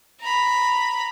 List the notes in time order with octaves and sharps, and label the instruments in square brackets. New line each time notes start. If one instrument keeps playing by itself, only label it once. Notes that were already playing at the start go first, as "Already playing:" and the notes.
[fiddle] A#5 B5